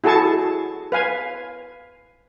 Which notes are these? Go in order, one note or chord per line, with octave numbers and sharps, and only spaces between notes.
E4 F#4 G#4 A4 A5 C#6
B4 F5 G#5